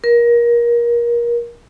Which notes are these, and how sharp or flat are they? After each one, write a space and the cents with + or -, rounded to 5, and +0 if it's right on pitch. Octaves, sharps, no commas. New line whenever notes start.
A#4 +25